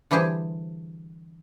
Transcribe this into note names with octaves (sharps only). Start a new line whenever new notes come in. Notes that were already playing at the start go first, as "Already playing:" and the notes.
D3 E3 G3 G4 G#4 C5